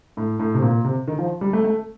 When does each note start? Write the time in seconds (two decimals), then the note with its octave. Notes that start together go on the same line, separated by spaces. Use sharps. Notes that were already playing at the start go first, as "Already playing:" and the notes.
0.17 A2
0.39 A2
0.54 C3
0.62 A#2
0.84 C3
1.08 D#3
1.19 F3
1.41 G3
1.53 A3
1.64 A3